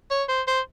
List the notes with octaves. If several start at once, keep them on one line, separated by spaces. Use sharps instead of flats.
C#5
C5
C5